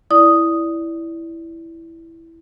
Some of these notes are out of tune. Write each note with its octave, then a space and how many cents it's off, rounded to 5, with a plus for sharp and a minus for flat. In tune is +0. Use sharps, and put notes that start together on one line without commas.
E4 +0 D5 -10 D#6 +0